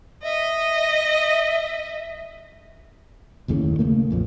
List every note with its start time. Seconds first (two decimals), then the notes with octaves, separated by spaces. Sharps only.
0.24 D#5 E5
3.48 F#1 D#2 A2 C#3
3.79 C#3 A3 A#3
4.10 A#1 F2 F3